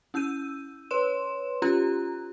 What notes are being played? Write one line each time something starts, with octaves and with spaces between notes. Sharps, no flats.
C#4 E4 E6 G6 D#7
B4 C#5 C6 E7
C#4 F4 G4 A#5 F#6